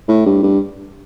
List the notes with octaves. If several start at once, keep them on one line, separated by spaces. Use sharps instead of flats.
A2
G2
G2